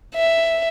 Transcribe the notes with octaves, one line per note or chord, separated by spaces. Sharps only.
E5